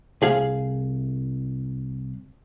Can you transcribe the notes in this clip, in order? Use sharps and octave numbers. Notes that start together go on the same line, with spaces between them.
C2 G#4 F5